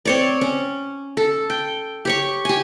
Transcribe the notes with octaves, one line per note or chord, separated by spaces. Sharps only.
C4 C#5 D5
C#4
A4
G5
G4 C#5 C#6
G4 G#5